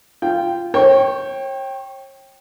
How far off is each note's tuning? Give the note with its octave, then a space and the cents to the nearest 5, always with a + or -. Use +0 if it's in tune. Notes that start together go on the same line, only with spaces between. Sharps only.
F4 -15 G5 +0
C#5 -40 G5 +0 C#6 +0